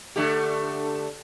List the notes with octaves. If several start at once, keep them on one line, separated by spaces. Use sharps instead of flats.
D3 A3 G4